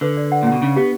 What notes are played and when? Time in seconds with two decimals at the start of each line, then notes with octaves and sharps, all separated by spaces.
0.01 D3 B4
0.17 D5
0.32 F#5
0.43 A#2
0.47 F#5
0.52 B2
0.61 C#3 D4
0.76 B3 G4